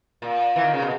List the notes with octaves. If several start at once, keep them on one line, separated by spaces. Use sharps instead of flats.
A#2
E3
D#3
C#3
B2